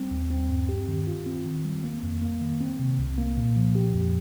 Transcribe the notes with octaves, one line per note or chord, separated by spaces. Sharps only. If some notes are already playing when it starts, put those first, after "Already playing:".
Already playing: G3 C4
D#2
C4
G2
G4
D#3
F4
C4
D#3
G3
A#3
F2
A#3
D#3
C4
C3
C2
A#3
A#2
F3
G4
F2